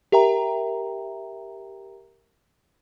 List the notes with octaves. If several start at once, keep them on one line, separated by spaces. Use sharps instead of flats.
G4 A#4 E5 G5 A#5